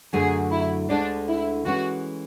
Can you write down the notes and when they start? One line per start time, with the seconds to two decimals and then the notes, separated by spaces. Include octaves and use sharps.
0.13 F#2 D3 F#3 A3 G#4
0.52 E4
0.90 D2 D3 G#3 D4
1.28 E4
1.66 E3 G#3 C#4 F#4